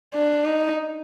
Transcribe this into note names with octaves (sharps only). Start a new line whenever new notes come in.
D4
D#4